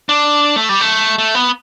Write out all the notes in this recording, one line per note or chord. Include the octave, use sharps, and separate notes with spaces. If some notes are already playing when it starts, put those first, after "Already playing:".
D4
A3
G3
A3
A3
B3